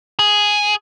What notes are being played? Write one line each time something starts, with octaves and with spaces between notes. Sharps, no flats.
G#4